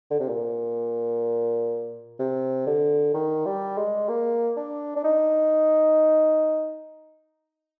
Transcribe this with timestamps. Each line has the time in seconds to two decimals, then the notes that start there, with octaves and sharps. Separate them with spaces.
0.11 D3
0.20 C3
0.29 A#2
2.19 C3
2.66 D3
3.14 D#3
3.46 G3
3.78 G#3
4.09 A#3
4.57 D4
4.96 D4
5.04 D#4